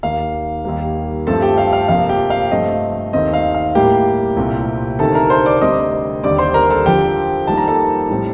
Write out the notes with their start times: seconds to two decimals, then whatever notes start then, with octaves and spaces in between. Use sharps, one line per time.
0.03 D#2 D#3 A#3 F5
0.65 D#2 D#3 G3 A#3
1.27 G2 F3 A3 C4 A4 A5
1.42 G4 G5
1.58 F5
1.73 F5
1.88 F2 C3 F3 A#3 F5
2.09 G4 G5
2.30 F5
2.51 G2 F3 A3 C4 D#5
3.13 D#2 D#3 A3 C4 D#5
3.33 F5
3.54 F5
3.75 A2 G3 A#3 G4 G5
4.37 C2 A#2 A3 C4
4.99 D2 C3 D#3 A3 A4 A5
5.15 A#4 A#5
5.30 C5 C6
5.46 D5 D6
5.61 D2 C3 G3 C4 D#5 D#6
6.23 D#2 D3 G3 C4 D5 D6
6.38 C5 C6
6.54 A#4 A#5
6.70 A4 A5
6.86 F2 D3 F3 G4 G5
7.47 F2 D#3 G3 A#3 A5
7.57 A#5
7.68 A4 A5
8.10 A2 G3 C4